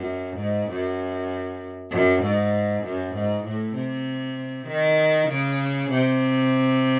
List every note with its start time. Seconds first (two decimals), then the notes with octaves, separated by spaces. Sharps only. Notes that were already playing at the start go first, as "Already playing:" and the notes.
Already playing: F#2
0.37 G#2
0.69 F#2
1.91 F#2
2.22 G#2
2.83 F#2
3.14 G#2
3.44 A2
3.75 C3
4.67 D#3
5.28 C#3
5.90 C3